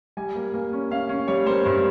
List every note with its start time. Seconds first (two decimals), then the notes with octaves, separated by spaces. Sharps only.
0.17 G3 G#5
0.35 A#3
0.54 A#3
0.73 C#4
0.91 C#4 F5
1.09 C#4
1.28 G3 C#5
1.46 A#3 C5
1.65 G2 C5